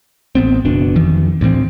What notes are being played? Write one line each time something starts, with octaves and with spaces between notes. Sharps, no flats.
A1 B3 C4
F#1 B2 D4
F2 D#3 E3
D2 A2 E3 C4